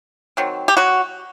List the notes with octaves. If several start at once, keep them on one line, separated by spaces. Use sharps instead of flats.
D#3 F#3 C4
G4
F#3 F#4